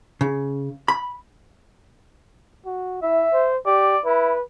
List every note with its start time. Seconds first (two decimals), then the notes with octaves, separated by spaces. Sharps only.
0.21 C#3
0.88 B5
2.66 F#4
3.02 E4 E5
3.33 C5
3.66 G4 D5
4.05 E4 B4